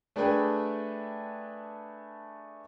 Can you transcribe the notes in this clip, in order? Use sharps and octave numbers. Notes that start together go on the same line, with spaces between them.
A3 D4 G#4 A4 B4 G5